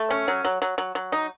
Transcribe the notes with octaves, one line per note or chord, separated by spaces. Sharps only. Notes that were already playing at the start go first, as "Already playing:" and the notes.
Already playing: A3
C#4
F#3
F#3
F#3
F#3
F#3
D#4